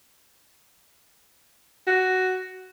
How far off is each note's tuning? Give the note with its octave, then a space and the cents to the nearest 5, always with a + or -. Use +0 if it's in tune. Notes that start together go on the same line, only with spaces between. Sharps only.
F#4 +10